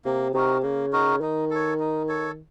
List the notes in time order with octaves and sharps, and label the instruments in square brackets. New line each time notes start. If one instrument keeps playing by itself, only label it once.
[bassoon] C3 [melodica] A#3
[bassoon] C3 [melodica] D#4 F#4 A#4
[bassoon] C#3 [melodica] A#3
[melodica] D#4 F#4 A#4
[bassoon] D#3 [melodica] D#4
[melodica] A4 C#5
D#4
A4 C#5